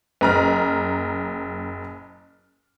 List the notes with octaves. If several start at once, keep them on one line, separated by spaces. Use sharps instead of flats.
F#1 A#5 F6